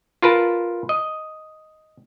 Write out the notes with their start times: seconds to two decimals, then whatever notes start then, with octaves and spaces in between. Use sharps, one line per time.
0.22 F4 A#4 B4 A5
0.89 D#5